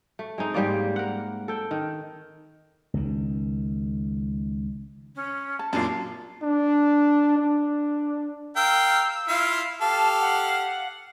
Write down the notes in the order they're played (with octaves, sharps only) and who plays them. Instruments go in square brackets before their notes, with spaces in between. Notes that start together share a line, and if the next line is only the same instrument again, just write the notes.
[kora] A3
G#3 C4 D#4
G#2 G3 A#3 D5
A#4 F#5
A4 G5
D#3
[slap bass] C#2 D#3
[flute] C#4
[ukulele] A5
[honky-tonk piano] F#2 A#2 [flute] D4 [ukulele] F5 A5
[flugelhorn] D4
D4
[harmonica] A#4 F5 G5 [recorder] E6
[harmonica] E4 F4 F5
[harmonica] G4 A4 F5 [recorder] A5
[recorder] F#5